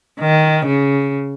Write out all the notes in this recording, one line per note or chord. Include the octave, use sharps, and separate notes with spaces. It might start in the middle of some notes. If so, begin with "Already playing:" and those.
D#3
C#3